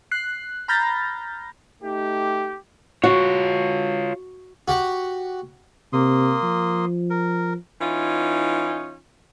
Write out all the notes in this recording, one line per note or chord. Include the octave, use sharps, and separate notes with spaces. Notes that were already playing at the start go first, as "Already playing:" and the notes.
F#6 C7
A#5 B5 F6 G6 A6 A#6
A3 D#4 G4
F4 F#4 C#5
F#4 G4 F#5
C3 A#3 C6 D#6
F3
A#4
E3 C#4 D#4 F4